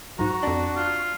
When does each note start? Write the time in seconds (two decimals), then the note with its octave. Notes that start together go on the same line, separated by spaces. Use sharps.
0.19 B1 G#2 F#4 A#5
0.43 F2 D4 D5
0.76 F4